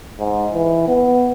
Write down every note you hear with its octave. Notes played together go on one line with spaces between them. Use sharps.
G#2
E3
B3